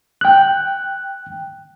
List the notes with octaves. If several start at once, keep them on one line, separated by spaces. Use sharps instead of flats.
G5 F#6